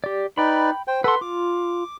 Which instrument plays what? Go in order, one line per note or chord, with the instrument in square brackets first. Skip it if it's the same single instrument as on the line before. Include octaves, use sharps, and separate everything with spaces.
[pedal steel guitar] G4 D5
[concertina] D#4 B4 D5 [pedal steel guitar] G5 B5
[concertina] C5 G5
[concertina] A4 F#5 [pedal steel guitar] B4 C6
[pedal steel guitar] F4 [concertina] D6